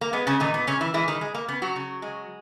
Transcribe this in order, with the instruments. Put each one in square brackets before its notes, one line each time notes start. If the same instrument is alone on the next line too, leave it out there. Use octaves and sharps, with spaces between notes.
[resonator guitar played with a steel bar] A#3
G#3 B3
C#3 C#4
A#2 D#3 D#4
B3
A#2 C#3 C#4
E3 E4
E3 G#3 E4
D#3 D#4
G#3
A#3
C#3 B3
F#3 F#4
C#3
G#3